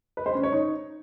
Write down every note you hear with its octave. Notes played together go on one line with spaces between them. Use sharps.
B4
C5
C#4
C#5
D#4